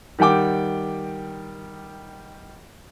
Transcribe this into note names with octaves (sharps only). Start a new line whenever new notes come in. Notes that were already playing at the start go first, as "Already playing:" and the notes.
D#3 G3 F#5 G5 D6